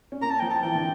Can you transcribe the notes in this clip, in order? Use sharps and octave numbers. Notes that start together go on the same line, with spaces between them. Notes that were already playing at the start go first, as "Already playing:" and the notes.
C#4
A#3 A#5
A5
F3 G5
A5
E3 G5
D3